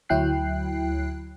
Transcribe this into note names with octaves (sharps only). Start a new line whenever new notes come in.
D2 F#3 E4 G5 F#6 C7